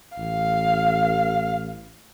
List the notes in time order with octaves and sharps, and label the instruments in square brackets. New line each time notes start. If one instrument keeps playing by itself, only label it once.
[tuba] A1 [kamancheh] F5